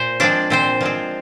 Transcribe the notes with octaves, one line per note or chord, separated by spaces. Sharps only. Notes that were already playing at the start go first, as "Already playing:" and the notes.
Already playing: A#2 C5
F3 G#3 C4 D4 D5
A#2 C4 C5
F3 G#3 C4